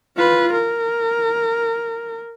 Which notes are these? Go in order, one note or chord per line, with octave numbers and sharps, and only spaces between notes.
F4 B4
A#4